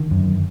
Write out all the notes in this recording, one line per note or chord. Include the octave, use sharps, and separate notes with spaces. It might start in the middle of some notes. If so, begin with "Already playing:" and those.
Already playing: D3 D#3
F#2